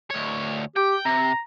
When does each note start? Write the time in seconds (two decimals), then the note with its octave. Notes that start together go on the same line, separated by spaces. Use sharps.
0.10 D2 C#5
0.76 G4 G5
1.05 C3 A#5